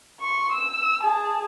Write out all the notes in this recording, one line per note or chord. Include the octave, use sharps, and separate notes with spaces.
C6 C#6
E6
G#4 A5